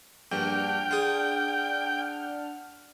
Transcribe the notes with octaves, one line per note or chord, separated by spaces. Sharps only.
A#1 G2 D4 F#5 G5 F6
F4 G#4